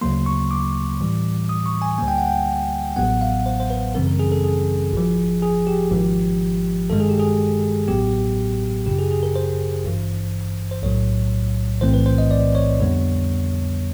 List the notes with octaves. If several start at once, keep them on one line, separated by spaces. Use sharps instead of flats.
D2 C#3 F#3 A#3 C6
C#6
D6
A2 E3 G3
D#6
C#6
G#5
D2 D3 G3 A#3 G#5
G5
F#5
G5
A1 A2 F#3 B3 F#5
F5
C5
C5
B4
F#2 C#3 E3 G3 C4 A#4
A#4
G#4
A4
G#4
G#1 G#2 F3
G#4
G4
G#1 G#2 F3
G2 D#3 G#3 A4
G#4
G4
G#4
A1 A2 F#3 B3 G4
G1 F#2 C#3 G4
G#4
G#4
A#4
C5
G#1 G2 E3
C5
B1 A2 F#3 C#5
B1 A2 E3 A3 C4 C5
B4
C5
D#5
D5
C#5
F2 D3 G3 B3